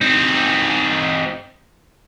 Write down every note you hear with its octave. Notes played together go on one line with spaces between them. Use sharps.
C4 D#4